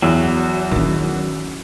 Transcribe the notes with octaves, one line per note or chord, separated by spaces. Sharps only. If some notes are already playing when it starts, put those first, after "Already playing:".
E2 F#3
D#3 C#4